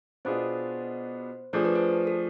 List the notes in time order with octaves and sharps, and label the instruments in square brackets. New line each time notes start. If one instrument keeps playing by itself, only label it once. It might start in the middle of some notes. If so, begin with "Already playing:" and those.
[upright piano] B2 B3 D4 F4 G#4 [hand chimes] C5
[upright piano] F3 A3 D4 G#4 [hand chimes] C5
[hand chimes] B4
C5
A4